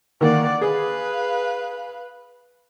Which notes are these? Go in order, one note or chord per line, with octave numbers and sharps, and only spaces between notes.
D#3 A#3 D5 F#5
G#4 B4 F5